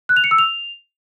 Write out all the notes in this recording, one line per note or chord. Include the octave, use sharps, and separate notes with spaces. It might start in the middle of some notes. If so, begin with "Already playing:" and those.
F#6
F7
C#7
E6
F7